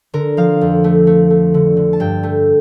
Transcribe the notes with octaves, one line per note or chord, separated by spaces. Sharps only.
D3 A#4
F3 F5
F2
A3
A3
A3
D3
D3
A5
G2 G5
A3